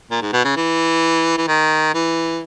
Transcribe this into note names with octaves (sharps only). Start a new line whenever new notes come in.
A#2
G#2
B2
C#3
E3
E3
D#3
E3